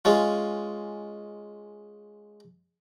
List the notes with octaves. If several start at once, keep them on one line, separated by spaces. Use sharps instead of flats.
G#3 C#4 F4